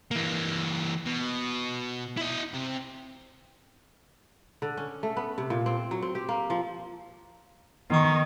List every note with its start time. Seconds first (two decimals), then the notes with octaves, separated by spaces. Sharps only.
0.11 E3 A#3
1.06 B2
2.17 E4 D#5
2.53 C3
4.62 D3
4.77 C#4
5.03 A3
5.17 B3
5.38 C3
5.50 A#2
5.66 C4
5.91 F#3
6.02 C4
6.15 G4
6.29 A#3
6.50 F3
7.90 D#3 B3 C#6